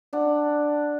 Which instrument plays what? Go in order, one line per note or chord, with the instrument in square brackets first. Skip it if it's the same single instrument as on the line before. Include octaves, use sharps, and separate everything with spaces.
[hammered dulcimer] D4 F#5